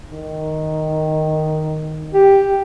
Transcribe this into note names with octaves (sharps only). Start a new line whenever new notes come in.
D#3
G4